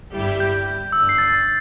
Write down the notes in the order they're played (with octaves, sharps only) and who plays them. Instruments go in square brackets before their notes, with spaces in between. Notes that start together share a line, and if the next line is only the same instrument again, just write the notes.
[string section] G1 G2 G3 E4 G4
[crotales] G6
G6
[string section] G1 G2 D3 [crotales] E6
[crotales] C7
A6